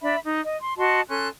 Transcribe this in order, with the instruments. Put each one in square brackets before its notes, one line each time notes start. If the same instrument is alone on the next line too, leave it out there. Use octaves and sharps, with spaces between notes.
[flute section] D4 E5 B5
D#4
D#5
C6
F#4 D#5 A5 C6
C#4 A4 C6 F#6